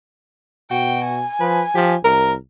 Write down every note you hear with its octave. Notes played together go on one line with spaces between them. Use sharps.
B2 F#4 G5
G#5
F3 B4
F3 G4
C2 A#4